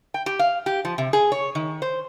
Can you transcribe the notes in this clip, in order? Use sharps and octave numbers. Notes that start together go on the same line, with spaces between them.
G5
G4
F5
G4
F3
C3
G#4
C#5
D#3
C5